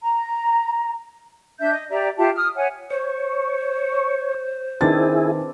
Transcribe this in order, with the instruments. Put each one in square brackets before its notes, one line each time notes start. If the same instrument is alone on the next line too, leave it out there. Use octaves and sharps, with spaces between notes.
[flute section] A#5
D4 E5 G6
D#5
G4 D5 E5 A#5
F4 G4 E5 A5
D#6 F6
C#5 E5 F#5 G#5
[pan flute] C5 [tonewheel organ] C#5
[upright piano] D#3 A6 [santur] C4 D4 B4 [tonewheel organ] E4 G#4